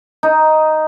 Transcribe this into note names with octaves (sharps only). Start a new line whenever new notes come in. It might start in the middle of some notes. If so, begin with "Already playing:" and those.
D#4